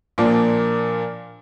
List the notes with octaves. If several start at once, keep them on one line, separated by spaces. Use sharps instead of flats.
A#2 F3 A#3 D4